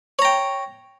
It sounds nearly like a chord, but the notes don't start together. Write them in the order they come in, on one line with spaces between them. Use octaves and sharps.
C#5 A#5 G5